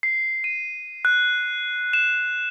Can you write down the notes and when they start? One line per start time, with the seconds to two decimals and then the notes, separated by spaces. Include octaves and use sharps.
0.03 C7
0.44 D#7
1.05 F#6
1.93 E7